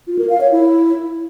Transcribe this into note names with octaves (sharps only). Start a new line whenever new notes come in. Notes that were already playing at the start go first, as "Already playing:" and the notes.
F4
A#4
F5
C#5
E4